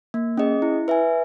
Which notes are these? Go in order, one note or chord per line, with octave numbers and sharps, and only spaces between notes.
A#3
C#4 G#4 D#5
E4
B4 E5 G#5